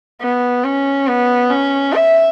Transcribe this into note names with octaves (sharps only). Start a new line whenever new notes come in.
B3
C#4
B3
C#4
E5